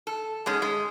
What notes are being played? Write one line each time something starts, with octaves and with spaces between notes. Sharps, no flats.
A4
G#2 G#3 C#4
G#3